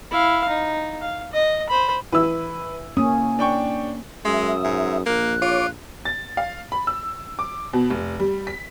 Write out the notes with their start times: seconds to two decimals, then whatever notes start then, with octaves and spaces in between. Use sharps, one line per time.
0.11 E4 F5
0.49 D#4
1.01 F5
1.32 D#5
1.69 C5 B5
2.12 E3 E4 B4 E6
2.97 A#3 C#4 D#6
3.39 D4 G5 C#6
4.25 F#2 G#3 E5 D#6
4.64 G#2
5.06 A#1 A#3 F#6
5.42 F4 C#5 D6
6.05 A6
6.37 F5
6.72 B5
6.87 E6
7.39 D6
7.73 B2
7.90 F1
8.19 G3
8.47 B6